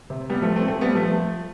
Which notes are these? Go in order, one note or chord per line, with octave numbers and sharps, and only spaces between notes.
C3
G3 B3
F3 A3
A3 C4
A3 C4
G3 B3
F3 A3